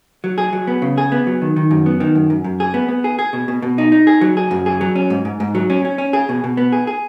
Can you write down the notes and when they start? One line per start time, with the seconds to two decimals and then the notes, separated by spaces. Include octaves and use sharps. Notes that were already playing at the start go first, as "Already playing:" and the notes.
0.24 F#3
0.38 G#4
0.53 F#3
0.67 B3
0.82 C#3
0.98 G#4
1.12 B3
1.27 F#3
1.42 D#3
1.56 D#3
1.71 F#2
1.86 B3
2.00 D#3
2.15 F#2
2.30 F#2
2.44 F#2
2.60 G#4
2.74 B3
2.88 B3
3.04 G#4
3.19 G#4
3.33 B2
3.48 B2
3.62 B2
3.78 D#4
3.92 D#4
4.07 G#4
4.21 F#3
4.37 G#4
4.51 F#2
4.66 G#4
4.81 F#3
4.95 C#4
5.10 G#2
5.25 G#2
5.40 G#2
5.55 F#3
5.70 C#4
5.85 C#4
5.98 C#4
6.13 G#4
6.29 B2
6.44 B2
6.57 B3
6.72 G#4
6.87 G#4